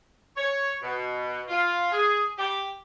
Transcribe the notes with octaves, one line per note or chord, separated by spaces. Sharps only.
C#5
B2
F4
G#4
G4